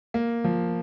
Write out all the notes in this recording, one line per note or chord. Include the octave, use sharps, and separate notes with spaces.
A#3
F3